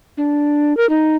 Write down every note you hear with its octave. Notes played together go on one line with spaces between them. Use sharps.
D4
A#4
D#4